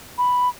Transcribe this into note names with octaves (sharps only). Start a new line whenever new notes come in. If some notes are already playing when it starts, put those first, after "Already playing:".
B5